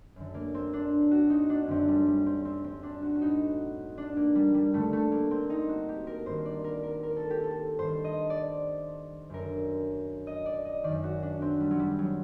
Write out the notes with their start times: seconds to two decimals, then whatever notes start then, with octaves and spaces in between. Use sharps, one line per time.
0.16 F#2 D3
0.34 A#3
0.54 C4
0.73 D4
1.11 F#4
1.30 D#4
1.50 D4
1.66 F#2 D3 C4
1.88 G3
2.07 G3
2.26 C4
2.45 C4
2.64 C4
2.83 D4
3.02 F#4
3.15 F#4
3.21 A2 D#4
3.98 D4
4.17 A#3
4.35 G3
4.54 G3
4.73 G2 D3 A3
4.93 A3
5.12 A#3
5.31 C4
5.50 D#4
5.69 F#4
5.89 G4
6.07 A#4
6.26 G2 D#3 C5
6.45 D5
6.64 A#4
6.83 A#4
7.03 A#4
7.16 A4
7.30 G4
7.44 A4
7.79 G2 D#3 C5
8.04 D#5
8.30 D5
9.29 F#2 D3 A#4
10.27 D#5
10.46 D5
10.65 D#5
10.84 F#2 D#3 D5
11.04 F#4
11.22 D4
11.42 C4
11.60 G3
11.71 F#3
11.79 G3
11.99 F#3